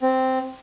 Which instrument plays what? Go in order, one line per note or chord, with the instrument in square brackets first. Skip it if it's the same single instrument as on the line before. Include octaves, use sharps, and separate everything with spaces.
[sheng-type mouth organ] C4